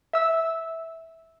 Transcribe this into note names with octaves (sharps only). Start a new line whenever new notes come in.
E5 E6